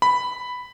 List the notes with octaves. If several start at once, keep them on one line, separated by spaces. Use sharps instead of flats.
B5